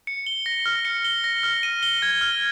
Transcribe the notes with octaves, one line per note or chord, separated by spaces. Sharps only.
C#7
G7
A#6
F6
C#7
G7
A#6
F6
D#7
G7
G#6
F6